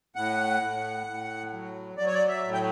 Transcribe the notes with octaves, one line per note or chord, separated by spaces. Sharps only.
A2 F#5
A2
A2
F#3
F#3 D5
C#5
D5
E5
A2
G5